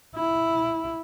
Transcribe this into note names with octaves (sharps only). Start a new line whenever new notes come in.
E4